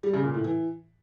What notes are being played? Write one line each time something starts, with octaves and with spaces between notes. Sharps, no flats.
G3
C#3
A#2
A2
E3